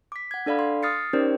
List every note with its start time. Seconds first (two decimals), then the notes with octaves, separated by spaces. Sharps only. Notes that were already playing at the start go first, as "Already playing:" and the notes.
0.12 D6 B6
0.31 F#5 G#6
0.46 D4 A4 D5 F5 B5
0.59 C6
0.83 D#6 F6 A6 C7 C#7
1.13 C#4 D#4 G4 A#4 C5 D5